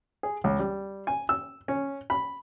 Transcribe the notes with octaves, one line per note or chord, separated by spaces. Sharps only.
G#4
C#2
G3
G#5
E6
C#4
B5